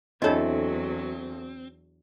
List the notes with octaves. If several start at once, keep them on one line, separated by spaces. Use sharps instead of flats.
E2 F#3 C4 D4 E4 A4 C#5 D#5